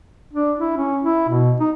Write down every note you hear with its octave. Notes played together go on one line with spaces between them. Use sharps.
D4
E4
C#4
E4
B2
D#4